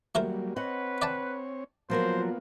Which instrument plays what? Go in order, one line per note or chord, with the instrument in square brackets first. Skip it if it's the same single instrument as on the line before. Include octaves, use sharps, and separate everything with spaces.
[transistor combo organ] F#3 G3 A#3 [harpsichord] A3 A#4 C5
[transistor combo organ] C4 C#5 [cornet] B4 [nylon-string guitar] D#5 F#5
[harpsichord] D5 G5 A5
[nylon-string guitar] F3 F#3 A#4 [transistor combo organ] A#3 B3 F4 [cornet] C5